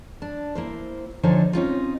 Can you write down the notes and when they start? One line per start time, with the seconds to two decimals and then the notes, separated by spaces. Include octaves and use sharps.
0.22 D4
0.55 A#3 E4 C5
1.23 D3 F3 D#4 C5 C#5 G#5
1.53 C4 C#4 D#4 F4